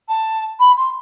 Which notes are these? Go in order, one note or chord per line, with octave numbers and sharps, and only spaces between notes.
A5
B5
C6